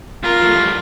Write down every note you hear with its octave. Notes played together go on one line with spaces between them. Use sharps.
G#2 F4 A#4
F3 A3
F3 G3